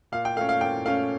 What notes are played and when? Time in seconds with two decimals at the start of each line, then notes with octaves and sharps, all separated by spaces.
0.12 A#2 F5
0.25 G5
0.37 A3 F5
0.41 C#4
0.49 F5
0.61 A#2 G5
0.85 A3 C#4 F5